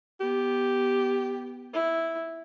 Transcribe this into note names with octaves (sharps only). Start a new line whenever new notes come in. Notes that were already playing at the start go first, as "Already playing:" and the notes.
B3 G4
E4